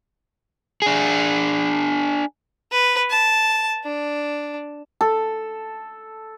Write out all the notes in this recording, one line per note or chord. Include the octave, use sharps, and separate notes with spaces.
D4 G#4
B4
A5
D4
A4